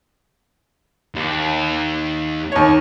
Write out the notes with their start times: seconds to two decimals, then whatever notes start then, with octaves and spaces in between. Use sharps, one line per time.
1.15 D#2
2.52 D#2 C#5